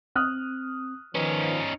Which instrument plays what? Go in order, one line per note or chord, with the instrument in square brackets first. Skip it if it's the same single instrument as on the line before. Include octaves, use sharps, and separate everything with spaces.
[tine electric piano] C4 [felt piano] D#6 F6 F#6
[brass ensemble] D#3 F3 [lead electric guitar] C#4 D#4 [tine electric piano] B4